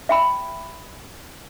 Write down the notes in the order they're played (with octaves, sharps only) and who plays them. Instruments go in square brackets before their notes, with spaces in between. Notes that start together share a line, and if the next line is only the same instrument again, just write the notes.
[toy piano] E5 G5 B5